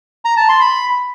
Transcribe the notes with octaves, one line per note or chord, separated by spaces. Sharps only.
A#5
A5
C6
B5